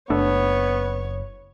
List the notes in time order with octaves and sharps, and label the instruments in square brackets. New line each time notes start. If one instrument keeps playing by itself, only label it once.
[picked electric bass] F#1 [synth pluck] A3 D4 A4 [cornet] B3 [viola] C#5